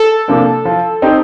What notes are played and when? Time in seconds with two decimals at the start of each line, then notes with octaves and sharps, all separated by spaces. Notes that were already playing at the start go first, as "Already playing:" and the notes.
Already playing: A4
0.28 C3 F3 A#3 D4
0.65 F3
1.02 C4 D#4 G4 C5